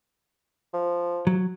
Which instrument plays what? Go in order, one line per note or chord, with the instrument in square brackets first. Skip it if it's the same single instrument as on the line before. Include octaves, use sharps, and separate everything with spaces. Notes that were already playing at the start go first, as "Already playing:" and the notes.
[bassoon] F3
[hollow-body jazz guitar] F#3